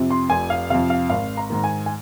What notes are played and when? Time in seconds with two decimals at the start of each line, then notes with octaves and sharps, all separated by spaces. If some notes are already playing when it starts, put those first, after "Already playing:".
Already playing: F2 C3
0.11 C6
0.30 F1 G#5
0.50 F5
0.70 F2 C3 F5
0.90 F5
1.10 G#1 F5
1.37 A#5
1.50 G#2 D#3
1.64 G#5
1.86 G#5